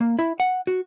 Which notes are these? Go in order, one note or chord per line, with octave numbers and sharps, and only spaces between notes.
A#3
E4
F#5
F#4